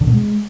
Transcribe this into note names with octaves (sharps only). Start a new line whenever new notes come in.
D3
B2
G#3